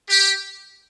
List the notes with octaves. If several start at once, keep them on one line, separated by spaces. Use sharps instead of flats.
G4